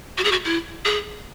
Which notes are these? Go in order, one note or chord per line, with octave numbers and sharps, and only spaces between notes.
F#4
G#4
F#4
E4
G#4